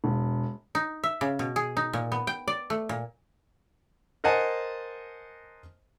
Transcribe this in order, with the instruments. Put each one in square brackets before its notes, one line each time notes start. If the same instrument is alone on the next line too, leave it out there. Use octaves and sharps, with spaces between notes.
[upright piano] E1
[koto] D#4
E5
C#3
B2
G#4
D#4
A#2
B3
G5
D5
A3
A#2
[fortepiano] A#4 C5 D#5 F#5 G#5 A5